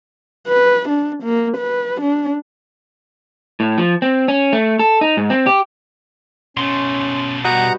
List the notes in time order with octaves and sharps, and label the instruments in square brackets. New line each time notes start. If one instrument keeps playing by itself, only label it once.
[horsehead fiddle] B4
D4
A#3
B4
D4
[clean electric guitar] A2
F3
C4
C#4
A3
A4
D#4
G#2
C4
G4
[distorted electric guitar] B2 A3 [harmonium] C#4 [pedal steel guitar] C6
[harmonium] G2 B3 [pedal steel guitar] F#4 G4 D#5 [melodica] F#5 A#5